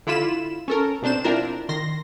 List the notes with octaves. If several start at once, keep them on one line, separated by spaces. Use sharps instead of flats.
D3 E4 F4 B5 E7
C#4 A4 A#4
B2 C4 D4 C5 E7
C4 D4 E4 F4 A#4
D#3 C6 A#6